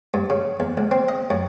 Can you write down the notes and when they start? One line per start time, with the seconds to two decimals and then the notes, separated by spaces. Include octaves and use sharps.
0.14 G2
0.30 C#3
0.60 E2
0.77 C#2
0.91 C4
1.09 D#5
1.30 F#2